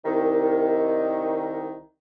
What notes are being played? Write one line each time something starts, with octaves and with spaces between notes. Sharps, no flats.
C2 D#3